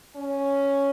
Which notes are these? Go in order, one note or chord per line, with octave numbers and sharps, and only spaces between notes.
C#4